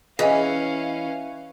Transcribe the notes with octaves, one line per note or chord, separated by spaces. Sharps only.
E3 C#4 G#4 D#5 F5 G#5